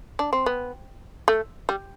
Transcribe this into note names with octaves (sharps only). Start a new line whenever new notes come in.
D4
C4
B3
A3
G3